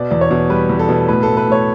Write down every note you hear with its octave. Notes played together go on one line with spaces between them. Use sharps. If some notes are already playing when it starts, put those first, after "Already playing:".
Already playing: B2 D5
E2 D5
C#5
B2
G3 B4
E2
A4
B2
A2 B4
A2 A4
B4
A2 C#5